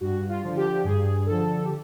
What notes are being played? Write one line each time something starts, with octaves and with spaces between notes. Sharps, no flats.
G2 F#4
F4
D3 F3
G4
G2 G#4
D3 F3 A4
G4